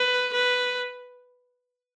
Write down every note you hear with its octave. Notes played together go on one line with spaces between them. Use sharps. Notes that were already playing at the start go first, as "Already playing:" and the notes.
Already playing: B4
B4